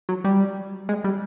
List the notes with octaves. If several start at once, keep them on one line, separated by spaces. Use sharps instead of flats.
F#3
G3
G#3
G3